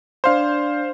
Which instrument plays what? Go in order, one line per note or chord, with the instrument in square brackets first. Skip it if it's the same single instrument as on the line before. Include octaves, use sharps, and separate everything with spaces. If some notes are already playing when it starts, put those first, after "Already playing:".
[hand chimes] D4 D5 C6 [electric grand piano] C5 F5